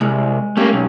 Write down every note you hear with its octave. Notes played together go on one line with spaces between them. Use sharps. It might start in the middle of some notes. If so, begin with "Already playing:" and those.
C2 G#3
G3 A3 A#3 C#4
B1